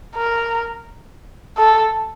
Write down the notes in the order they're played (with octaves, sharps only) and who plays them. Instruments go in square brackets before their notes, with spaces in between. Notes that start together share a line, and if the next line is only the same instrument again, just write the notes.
[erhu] A#4
A4